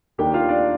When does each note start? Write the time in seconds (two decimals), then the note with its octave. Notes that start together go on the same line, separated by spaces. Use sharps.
0.18 D#2 D#3 A#3 D4 G4 G5
0.34 F4 F5
0.49 D4 D5